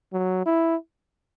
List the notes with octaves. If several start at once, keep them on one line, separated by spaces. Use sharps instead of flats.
F#3
E4